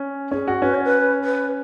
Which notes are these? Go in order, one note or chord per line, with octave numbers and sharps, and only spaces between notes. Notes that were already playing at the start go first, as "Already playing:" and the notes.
Already playing: C#4
C#4 G#4
F#4
C#4 B4
C#5
B4
B4